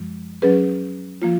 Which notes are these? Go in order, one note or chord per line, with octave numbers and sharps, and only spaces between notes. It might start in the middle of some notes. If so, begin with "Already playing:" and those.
Already playing: F#2 F3 G#3
F#3 C#4 G#4 B4
F3 A#3 F4